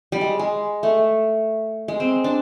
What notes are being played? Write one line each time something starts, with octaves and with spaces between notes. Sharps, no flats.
G3
G#3
G#3
A3
G#3
C4
D4